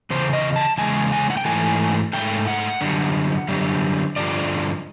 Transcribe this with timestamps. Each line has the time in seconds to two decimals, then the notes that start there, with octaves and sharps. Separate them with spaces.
0.10 E2 C#3 C5
0.33 D#5
0.56 A5
0.78 E2 C#3 G#3 G#5
1.12 G#5
1.30 F#5
1.37 G5
1.45 G#2 E3 A3 G#5
2.13 G#2 E3 A3 G5
2.47 F#5
2.81 F#2 D3 G3
3.48 F#2 D3 G3
4.16 G2 D3 F3 D5